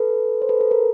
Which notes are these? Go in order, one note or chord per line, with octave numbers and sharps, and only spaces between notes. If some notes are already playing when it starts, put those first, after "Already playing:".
Already playing: A4 B4
C5
A4 B4
A4
A#4